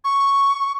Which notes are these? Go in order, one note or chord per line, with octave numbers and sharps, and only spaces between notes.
C#6